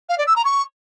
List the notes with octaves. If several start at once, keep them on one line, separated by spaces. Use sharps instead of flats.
F5
D5
E6
A#5
C#6